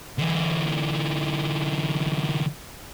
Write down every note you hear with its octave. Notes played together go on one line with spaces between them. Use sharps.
D3 E3